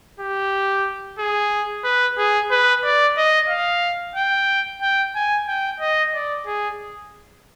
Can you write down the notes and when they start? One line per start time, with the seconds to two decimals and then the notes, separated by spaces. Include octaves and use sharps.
0.20 G4
1.19 G#4
1.84 B4
2.18 G#4
2.51 B4
2.84 D5
3.17 D#5
3.49 F5
4.16 G5
4.82 G5
5.15 G#5
5.48 G5
5.80 D#5
6.14 D5
6.46 G#4